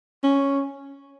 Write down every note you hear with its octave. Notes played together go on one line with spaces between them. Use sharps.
C#4